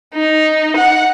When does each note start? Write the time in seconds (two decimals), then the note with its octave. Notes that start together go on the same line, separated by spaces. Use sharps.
0.14 D#4
0.76 F#5